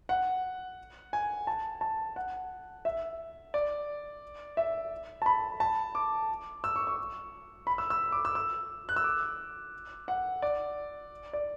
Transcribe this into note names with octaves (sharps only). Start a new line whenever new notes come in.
F#5
G#5
A5
A5
F#5
E5
D5
E5
A5
B5
A5
D6
E6
C#6
C#6
B5
E6
E6
D6
E6
E6
F#6
E6
D6
F#5
D5
D5